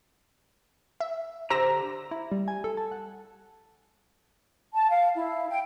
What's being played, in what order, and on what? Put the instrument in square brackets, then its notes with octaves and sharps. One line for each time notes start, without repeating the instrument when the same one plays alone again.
[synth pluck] E5
[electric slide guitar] D3 G4 A#5 [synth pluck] C5 E6 A#6
[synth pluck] E4
G3
G#5
A4
A5
F#5
[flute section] A5
F5
E4
G5